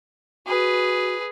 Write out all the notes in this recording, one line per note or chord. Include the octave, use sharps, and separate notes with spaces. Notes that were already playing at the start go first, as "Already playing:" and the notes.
F#4 G#4 B4